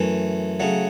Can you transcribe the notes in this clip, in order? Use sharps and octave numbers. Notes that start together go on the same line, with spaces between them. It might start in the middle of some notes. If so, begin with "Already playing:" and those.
Already playing: F#2 E3 A3
C#3 F#3 A3